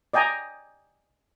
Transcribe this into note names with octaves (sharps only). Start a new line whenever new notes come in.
D5 D#5 G5 G#5 A#5